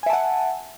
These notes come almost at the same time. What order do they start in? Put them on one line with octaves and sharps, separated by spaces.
G#5 E5 A5 F#5